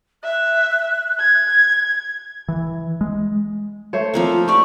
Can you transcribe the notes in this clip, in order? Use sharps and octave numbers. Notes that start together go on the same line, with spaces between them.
E5 F#6
G#6
E3
G#3
A3 C5 C#5
F3 A#3 C4
F4
G4 D5 C#6